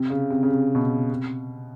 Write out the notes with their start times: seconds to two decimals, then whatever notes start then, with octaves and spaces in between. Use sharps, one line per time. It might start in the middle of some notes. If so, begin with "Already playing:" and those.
Already playing: C3
0.10 C#3
0.30 C3
0.43 C#3
0.50 C3
0.75 B2
0.80 C3
1.10 C3